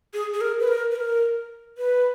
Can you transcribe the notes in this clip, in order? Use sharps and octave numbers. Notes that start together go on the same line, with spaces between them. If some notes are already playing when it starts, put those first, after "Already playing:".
G#4
G#4
A#4
B4
A#4
B4
A#4
B4